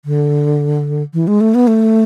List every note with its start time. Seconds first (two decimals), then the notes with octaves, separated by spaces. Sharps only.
0.05 D3
1.14 E3
1.27 G#3
1.41 A3
1.55 B3
1.67 A3